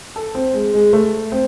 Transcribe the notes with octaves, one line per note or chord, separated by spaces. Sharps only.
A4
C4
G#3
G#3
A3
C4